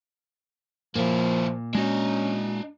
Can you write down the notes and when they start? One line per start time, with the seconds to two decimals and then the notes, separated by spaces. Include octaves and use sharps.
0.96 A#2 F3 A#3 E4
1.75 G#3 C#4 D4 F#4 D#5